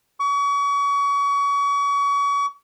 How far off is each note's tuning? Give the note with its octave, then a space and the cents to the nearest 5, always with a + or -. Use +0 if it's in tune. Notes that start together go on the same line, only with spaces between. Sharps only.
C#6 +35